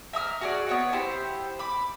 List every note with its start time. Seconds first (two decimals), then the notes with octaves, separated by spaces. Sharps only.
0.13 E5 A#5 D#6 F6
0.41 F#4 G#4 D5
0.67 B3 C#5 F#5
0.93 E4 G4 C5
1.59 B5 D6